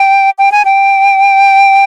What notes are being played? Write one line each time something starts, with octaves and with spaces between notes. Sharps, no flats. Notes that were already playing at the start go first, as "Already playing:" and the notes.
Already playing: G5
G5
G#5
G5